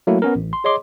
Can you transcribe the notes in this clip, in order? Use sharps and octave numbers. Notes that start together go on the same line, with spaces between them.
F#3 A3 A#3 E4 F#4
B3 C#4 A#4
A1
C6
G#4 C#5 D#5 C6 D6